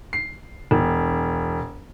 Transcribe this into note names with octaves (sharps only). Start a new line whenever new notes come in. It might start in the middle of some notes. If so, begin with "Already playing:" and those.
C7
E1